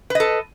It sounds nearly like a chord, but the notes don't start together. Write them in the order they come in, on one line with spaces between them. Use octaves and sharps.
B4 D#5 A4